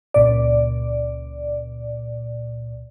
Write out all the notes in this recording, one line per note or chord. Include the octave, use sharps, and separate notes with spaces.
C#2 A#2 D5